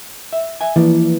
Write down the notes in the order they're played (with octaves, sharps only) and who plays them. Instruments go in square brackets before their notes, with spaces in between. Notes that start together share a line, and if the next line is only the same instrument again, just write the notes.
[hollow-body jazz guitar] E5
E5 G#5
[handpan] E3 [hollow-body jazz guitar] F3 A#3 D5